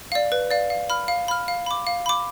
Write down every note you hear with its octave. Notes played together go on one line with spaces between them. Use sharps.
D5 F5
B4
D5 F5
F5
B5 F6
F5
B5 F6
F5
B5 D6
F5
B5 D6